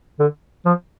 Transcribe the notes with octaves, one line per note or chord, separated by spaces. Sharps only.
D3
F3